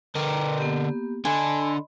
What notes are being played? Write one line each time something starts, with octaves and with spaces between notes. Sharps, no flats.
D3 A#4 B4 G5 D6
A#3 B3 G4
D3 A4 D#5 G#5 B5 C6